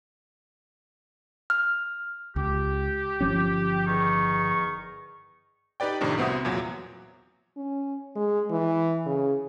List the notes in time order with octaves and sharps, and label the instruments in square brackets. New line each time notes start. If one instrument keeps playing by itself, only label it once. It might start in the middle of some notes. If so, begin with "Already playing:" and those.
[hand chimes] F6
[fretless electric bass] C#2 [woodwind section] G4
[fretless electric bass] G1 F3 C#4
[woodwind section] E2 D#3 C#6
[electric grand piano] D#4 G4 B4 D5 G5
F2 A2 C3 D#3 D4
C2 B3 C4 F#4 E5 D#6
E2 A#2 F#3
[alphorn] C#4
G#3
E3
C#3